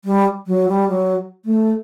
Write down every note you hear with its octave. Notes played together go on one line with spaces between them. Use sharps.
G3
F#3
G3
F#3
A3